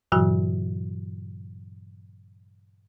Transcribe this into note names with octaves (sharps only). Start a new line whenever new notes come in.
G2 A#2 C#3 E3 F#3 F#4